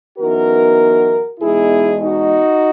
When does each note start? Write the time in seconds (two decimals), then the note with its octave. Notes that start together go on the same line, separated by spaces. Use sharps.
0.18 F#2 E3 B3 D#4 F#4 A#4
1.40 E2 B2 G#3 D#4 E4 G#4
2.02 D#4 F#4